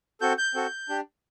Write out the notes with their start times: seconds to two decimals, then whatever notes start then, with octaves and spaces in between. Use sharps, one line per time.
0.21 C4 F#4 A4 G6
0.38 G6
0.54 C4 F#4 A4
0.89 D4 G4